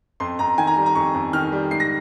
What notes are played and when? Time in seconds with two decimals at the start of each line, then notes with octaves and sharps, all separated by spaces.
0.20 F2 C6
0.39 F2 A#5
0.58 D#3 G#5
0.67 A#5
0.77 G3
0.86 A#5
0.95 F2 C#6
1.14 F2
1.33 D#3 F6
1.52 G3
1.71 G#2 C7
1.80 A#6